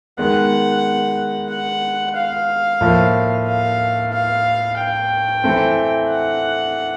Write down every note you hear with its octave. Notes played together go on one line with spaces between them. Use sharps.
D#3 G#3 B3 F#5
F#5
F5
A2 F3 A#3
F5
F5
G5
E3 A3 C4
F#5